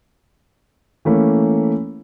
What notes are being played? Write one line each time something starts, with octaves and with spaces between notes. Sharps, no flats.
E3 A3 A#3 C#4